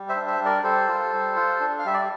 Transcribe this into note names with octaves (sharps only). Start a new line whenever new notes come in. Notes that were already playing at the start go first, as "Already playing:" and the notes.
Already playing: G3
C5 E5
D4
C5 E5
G3
A#4 D5
G3 A4 C5
F4
G3
F4
D4
F5
G3 E5
D5